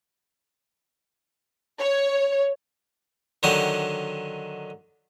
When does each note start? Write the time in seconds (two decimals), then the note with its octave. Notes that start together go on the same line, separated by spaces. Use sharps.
1.80 C#5
3.43 D3 D#3 F#3 G4 D#6